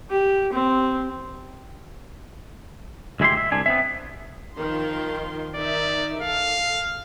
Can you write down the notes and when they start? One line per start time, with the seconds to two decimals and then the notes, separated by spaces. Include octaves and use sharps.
0.10 G4
0.53 C4
3.20 D2 G#3 E4 G4 C6
3.37 E5
3.52 C2 D4 G#5
3.66 B3 C4 E5
4.56 D#3 F3 C6
5.55 D#3 D#4 D5 E5
6.22 A4 F5